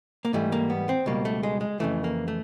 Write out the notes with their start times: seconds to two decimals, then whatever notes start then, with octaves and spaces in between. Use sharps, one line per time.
0.25 A#3
0.33 G#2 E3 G3 A3
0.52 A#3
0.70 B3
0.89 C4
1.06 C#2 B2 G3 A#3
1.25 A3
1.43 G#3
1.61 G#3
1.80 F2 C#3 E3 A3
2.04 A#3
2.28 A3